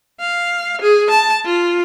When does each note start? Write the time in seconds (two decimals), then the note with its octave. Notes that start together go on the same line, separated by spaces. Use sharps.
0.21 F5
0.81 G#4
1.10 A5
1.45 F4